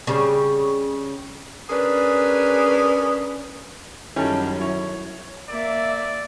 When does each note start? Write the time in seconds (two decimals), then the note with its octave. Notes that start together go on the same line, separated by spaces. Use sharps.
0.07 C#3 G3
1.70 C#4 D4 G#4 A#4 B4
4.16 F#2 D#3 G3 C#4 E4 A4 A5
4.61 E4 C#5
5.49 A#3 D5 E5